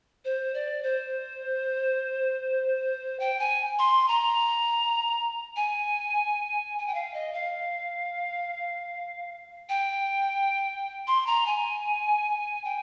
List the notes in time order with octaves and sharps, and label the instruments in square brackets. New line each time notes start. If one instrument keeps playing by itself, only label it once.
[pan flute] C5
D5
C5
G5
G#5
C6
A#5
G#5
G#5
G5
F5
D#5
F5
G5
C6
A#5
G#5
G5